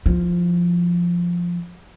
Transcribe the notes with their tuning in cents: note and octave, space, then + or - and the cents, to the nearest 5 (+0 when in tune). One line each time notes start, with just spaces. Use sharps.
F3 +0 E4 -30